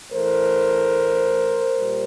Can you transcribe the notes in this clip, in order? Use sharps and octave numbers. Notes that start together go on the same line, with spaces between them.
A2 E3 A3 A#4 C5
A#2 G3